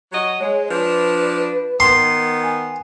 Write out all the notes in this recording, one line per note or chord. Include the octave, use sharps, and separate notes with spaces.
F#3 F#4 D#5
G#3 C#5
F3 D4 B4
D#3 B3 C6
G#5